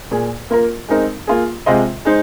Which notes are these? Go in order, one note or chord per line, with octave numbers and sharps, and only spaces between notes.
A#2 A#3 G#4
A#3 F4 A#4
G#3 C4 D#4 A#4 D#5
A#3 F4 G#4
C3 G#3 F4 C5 D#5
G#3 D#4 C5